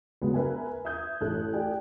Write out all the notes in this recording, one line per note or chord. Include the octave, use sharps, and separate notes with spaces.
C#2 F#3 G#3 B3
A#4 B4 E5 G#5
E5 D#6 G6 G#6
A1 A4 F#6
G4 A4 D5 G5 G#5